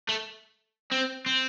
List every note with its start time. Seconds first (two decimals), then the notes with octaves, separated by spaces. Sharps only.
0.09 A3
0.92 C4
1.26 C4